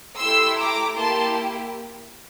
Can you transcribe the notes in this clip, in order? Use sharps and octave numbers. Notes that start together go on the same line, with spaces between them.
A3 E4 G4 C6 E6
A#5 D6
A#3 E4 G4 A5 C6